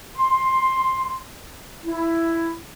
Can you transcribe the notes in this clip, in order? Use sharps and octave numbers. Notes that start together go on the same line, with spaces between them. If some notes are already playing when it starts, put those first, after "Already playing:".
C6
E4